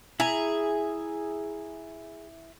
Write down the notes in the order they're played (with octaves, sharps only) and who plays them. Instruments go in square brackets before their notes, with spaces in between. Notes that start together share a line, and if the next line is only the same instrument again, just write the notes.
[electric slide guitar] E4 E5 A#5 [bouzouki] G#4